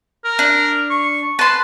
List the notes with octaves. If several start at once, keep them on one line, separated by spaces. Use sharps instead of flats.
A#4
D4
C#6
B4 A5 C6